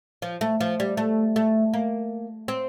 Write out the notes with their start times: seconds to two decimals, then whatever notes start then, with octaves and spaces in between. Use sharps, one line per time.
0.22 F3
0.41 A3
0.61 F3
0.80 G3
0.97 A3
1.36 A3
1.74 A#3
2.48 C4